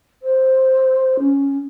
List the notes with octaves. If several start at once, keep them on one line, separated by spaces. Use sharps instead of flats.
C5
C#4